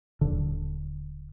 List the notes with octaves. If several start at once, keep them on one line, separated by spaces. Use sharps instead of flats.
D#1 D3